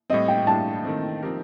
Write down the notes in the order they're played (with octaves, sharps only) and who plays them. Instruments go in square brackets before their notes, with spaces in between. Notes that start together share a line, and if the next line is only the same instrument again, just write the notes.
[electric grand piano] A2 G3 C4 [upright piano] D#5
[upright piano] G5
[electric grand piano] A2 G3 D4 [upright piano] A5
[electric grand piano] D#3 A3 C4
F3 C4 D#4 G4 A#4